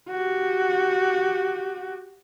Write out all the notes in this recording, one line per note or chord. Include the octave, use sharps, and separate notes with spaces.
F#4 G4